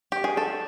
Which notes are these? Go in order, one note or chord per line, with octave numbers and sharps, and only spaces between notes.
G4
G#4
A4